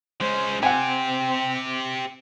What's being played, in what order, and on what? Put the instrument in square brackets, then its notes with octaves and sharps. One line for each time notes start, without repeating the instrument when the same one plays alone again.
[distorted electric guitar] G#3 C#4 [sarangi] C5
[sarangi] C4 [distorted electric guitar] G4 C5 [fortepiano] F#5 G#5